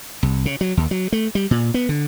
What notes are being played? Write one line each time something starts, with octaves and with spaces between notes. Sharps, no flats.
C2
C#3
F#3
D#2
F#3
A3
G3
A#2
B3
D3